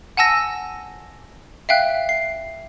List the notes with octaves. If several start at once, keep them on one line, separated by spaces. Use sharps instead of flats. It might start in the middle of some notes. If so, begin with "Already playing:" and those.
F#5 G#5 A5 E6 A#6
E5 F5 G5 F#6
C7